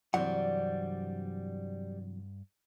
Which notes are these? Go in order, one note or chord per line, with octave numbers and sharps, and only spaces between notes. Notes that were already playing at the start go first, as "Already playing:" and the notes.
G2 C3 E3 F#3 G3 C5 D5 F#5